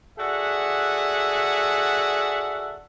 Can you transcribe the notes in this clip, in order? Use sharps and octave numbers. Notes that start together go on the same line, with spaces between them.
F#4 G#4 A4 D5 E5 F#5